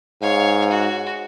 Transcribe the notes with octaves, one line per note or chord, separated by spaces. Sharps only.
G#2 C#5 F5
F#4